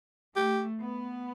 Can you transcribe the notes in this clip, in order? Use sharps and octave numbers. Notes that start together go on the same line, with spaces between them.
A3 G4
B3